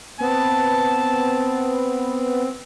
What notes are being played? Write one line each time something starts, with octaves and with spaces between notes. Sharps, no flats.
B3 C4 A5